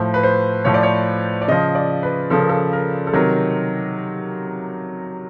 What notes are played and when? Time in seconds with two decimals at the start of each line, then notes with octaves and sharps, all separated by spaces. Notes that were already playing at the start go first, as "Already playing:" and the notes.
Already playing: A2 F3 C5
0.14 B4
0.23 C5
0.65 A2 F3 C#5
0.74 D5
0.83 C#5
1.42 D5
1.48 C#3 F3 D#5
1.75 D5
2.03 B4
2.30 C#3 F3 A4
2.39 A#4
2.49 A4
2.73 A#4
3.07 A4
3.13 C3 D#3 F#3 A#4